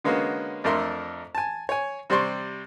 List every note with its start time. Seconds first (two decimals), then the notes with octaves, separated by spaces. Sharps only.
0.04 D3 G#3 A#3 B3 C#4 F#4
0.64 F2 A3 D4 A#4 E5 C6
1.35 G#5 A5
1.69 C#5 G#5
2.10 C3 G3 C5 D5 C6 C#6